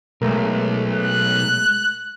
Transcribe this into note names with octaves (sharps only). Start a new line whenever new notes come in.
B1 G#3 A3 A#4
F#6